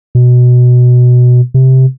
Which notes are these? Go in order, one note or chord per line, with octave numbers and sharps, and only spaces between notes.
B2
C3